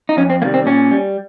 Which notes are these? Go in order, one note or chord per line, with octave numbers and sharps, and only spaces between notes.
D#4
F2 C#4
C4
C3 D#3 G3 A#3
C4
A#2 C#4
G3